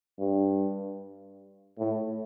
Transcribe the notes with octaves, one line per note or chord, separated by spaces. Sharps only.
G2
A2